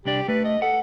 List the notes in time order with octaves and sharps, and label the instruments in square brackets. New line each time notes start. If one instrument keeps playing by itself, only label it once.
[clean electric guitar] C2 D4 D5 [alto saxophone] G4
[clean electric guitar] A3 [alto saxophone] B4
[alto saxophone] D#5
[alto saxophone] A4 [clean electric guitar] F#5